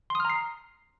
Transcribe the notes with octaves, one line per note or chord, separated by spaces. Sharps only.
A#5 C6 D#6 F6 C7